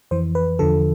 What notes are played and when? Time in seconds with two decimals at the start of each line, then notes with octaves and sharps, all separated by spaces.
0.11 F2 E3 C5
0.35 B4
0.59 E2 D3 F3 A4